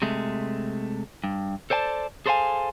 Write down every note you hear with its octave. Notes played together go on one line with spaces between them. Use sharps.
C3 G#3 A3
G2
A4 C5 D5 G#5 A5
G#4 A4 C5 C#5 F5 G#5